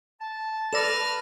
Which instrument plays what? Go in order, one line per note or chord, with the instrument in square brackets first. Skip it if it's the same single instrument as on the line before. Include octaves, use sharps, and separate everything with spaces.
[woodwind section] A5
[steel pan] A4 D5 [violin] B4 F6 [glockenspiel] A#6 E7